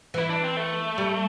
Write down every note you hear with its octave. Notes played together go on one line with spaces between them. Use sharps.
E3 E4
D4
C4
A3
G3